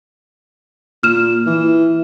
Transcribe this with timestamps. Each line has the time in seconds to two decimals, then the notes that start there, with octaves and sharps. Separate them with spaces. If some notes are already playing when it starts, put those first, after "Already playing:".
1.03 A#2 F6 E7
1.46 E3